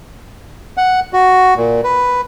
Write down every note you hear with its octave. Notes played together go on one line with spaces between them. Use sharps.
F#5
F#4
A#2
B4